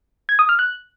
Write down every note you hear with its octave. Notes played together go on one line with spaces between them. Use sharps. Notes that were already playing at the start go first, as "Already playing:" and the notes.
G#6
D#6
F6
F#6